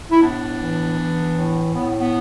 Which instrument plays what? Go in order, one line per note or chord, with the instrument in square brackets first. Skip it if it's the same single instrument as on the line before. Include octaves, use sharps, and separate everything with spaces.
[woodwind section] E4
A2 B3 D4
E3
E3
A2
A2 B3
B3